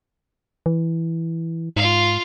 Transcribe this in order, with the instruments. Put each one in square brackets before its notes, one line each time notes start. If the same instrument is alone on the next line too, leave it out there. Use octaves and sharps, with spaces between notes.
[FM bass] E3
[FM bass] G#2 [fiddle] F4 F5